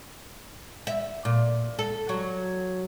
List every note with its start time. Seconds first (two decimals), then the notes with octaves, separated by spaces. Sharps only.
0.87 E5
1.25 A#2
1.79 A4
2.09 F#3